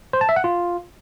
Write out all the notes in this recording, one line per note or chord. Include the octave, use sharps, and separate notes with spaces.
C5
A5
E5
F#5
F4